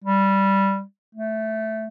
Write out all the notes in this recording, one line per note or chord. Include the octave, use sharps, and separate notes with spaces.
G3
A3